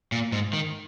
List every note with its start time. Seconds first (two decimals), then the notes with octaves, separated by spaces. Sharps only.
0.12 A#2
0.32 G#2
0.53 D#3